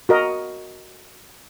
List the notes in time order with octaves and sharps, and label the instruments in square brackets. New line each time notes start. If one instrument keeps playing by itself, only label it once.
[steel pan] F#4 A#4 D#5